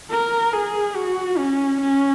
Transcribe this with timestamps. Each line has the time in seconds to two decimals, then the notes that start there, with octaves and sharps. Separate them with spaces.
0.11 A#4
0.53 G#4
0.96 F#4
1.38 C#4
1.81 C#4